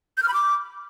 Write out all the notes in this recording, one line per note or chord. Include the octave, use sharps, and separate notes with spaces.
G6
F6
B5
D6